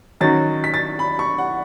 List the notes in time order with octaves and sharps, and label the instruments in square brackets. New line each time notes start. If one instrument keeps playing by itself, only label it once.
[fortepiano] D#3 F#3 C#4 F#4 [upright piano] A6
[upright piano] B6
A6
B5
C#6
F#5